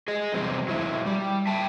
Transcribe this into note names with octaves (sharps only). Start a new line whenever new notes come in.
G#4 D#5
E2 C3 F#3 G3 C4
F#3 G#3 E4
G3
E5 G5 A5